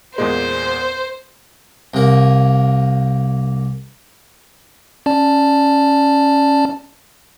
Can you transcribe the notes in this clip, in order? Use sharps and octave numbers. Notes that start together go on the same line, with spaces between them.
E2 A#2 G#3 C5
C2 A#3
C#4 D5 A5